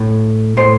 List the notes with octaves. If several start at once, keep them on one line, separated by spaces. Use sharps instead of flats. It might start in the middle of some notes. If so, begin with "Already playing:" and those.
Already playing: A2
A2 C5